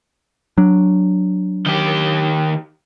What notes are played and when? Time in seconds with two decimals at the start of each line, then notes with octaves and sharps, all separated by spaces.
0.58 F#3 D4
1.66 D#3 G4